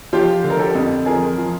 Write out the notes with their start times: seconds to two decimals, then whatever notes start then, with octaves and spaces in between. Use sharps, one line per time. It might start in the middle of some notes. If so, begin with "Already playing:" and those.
0.13 F3 F4 G4
0.44 D3
0.50 A#4
0.59 G4 A4
0.75 F2
1.06 F3 G#4 A#4
1.37 F3